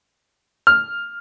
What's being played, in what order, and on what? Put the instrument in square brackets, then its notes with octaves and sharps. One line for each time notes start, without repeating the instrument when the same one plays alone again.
[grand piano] F6